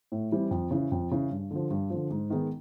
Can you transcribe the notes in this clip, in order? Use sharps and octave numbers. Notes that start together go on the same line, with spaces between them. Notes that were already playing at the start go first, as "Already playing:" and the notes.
A2
E3 G3 C4
F2
C#3 E3
F2
C#3 E3
G2
D3 F3
G2
D3 F3
G#2
D#3 G#3 B3 D#4